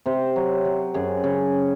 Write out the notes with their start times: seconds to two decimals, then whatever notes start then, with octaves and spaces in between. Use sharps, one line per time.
0.06 C3 C5
0.36 F#3
0.65 F#3
0.94 F#2 G#4
1.24 C#3